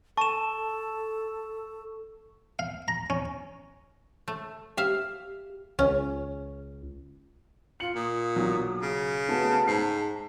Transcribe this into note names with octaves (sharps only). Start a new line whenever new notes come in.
A4 A5 C#6 E7
F5
A#5
C#4
A3
G4 E5 F5
C#2 C#4
F4 C#7 F#7
A#2 D#6
B1 F#3
C#3
A3 B3 F#4 A5
G#2 C7